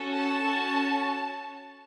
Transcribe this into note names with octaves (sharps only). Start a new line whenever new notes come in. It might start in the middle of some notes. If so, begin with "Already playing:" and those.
Already playing: C#4 F#4 A4
A5
C#4 F#4 A4